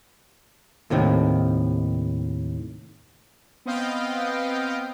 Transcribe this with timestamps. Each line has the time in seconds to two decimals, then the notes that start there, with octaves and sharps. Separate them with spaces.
0.90 D#2 A2 C3 D#3
3.66 B3 C4 D#5 F5 G5